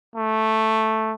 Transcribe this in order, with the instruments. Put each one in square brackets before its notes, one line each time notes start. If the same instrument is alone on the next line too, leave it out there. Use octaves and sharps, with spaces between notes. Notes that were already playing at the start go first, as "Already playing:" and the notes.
[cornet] A3